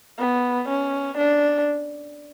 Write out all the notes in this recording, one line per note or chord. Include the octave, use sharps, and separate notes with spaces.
B3
C#4
D4